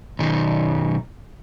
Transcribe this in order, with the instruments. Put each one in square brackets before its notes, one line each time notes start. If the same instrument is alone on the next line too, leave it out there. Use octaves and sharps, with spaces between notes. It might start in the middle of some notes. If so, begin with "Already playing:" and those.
[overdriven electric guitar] B1 D#3